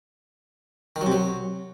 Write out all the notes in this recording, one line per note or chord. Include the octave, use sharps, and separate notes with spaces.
D#3
F#3
C3
F#3